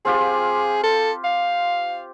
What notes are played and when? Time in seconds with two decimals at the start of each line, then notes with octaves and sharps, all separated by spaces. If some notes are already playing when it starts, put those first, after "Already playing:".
0.05 C4 F4 G4 G#4
0.84 A4
1.24 F5